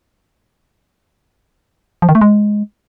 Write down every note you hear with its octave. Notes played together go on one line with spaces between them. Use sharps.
F3
D#3
A3
G#3